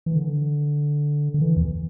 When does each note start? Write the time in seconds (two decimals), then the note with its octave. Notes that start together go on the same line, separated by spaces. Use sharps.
0.06 E3
0.16 D3
1.34 D3
1.41 E3
1.57 E2